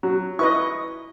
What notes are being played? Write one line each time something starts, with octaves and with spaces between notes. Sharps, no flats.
F#3
E4 B4 D#5 C#6